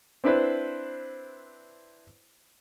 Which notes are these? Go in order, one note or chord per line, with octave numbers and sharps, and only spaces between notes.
C4 D4 E4 B4 C5